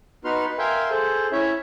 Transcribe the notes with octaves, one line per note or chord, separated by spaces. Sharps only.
B3 D#4 F#4 B4 C6 F6
B4
A#4 E5 F5 G5 G#5 C6
G#4 A4 C5
C#4 E4 C#5 E5